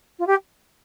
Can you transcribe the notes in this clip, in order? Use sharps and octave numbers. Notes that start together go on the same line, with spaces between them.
F4
G4